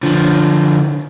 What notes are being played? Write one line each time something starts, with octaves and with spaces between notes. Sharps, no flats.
D3 F3